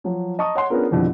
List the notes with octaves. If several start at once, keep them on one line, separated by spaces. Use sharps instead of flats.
F3 F#3
D#5 A5 A#5 C#6 D#6
C#5 F#5 C6
B3 C#4 D4 F4 G#4 A#4
F2 B2 D3 E3 F3 G3